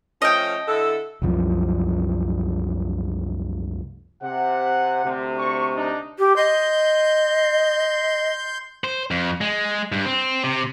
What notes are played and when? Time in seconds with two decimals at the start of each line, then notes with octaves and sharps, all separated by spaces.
0.22 F3 A3 C#4 D#5 G5
0.68 D3 E4 A4
1.22 C2 F#2 F3
4.22 C3 F#5
5.04 D2 C3
5.38 C#6
5.74 D4 D#4
6.19 G4
6.36 D#5 C6 G6
8.84 C5
9.11 F2
9.41 G#3
9.92 G2
10.05 C4
10.44 C3